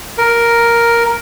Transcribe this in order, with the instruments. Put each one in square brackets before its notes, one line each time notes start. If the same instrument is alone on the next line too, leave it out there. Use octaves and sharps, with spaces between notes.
[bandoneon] A#4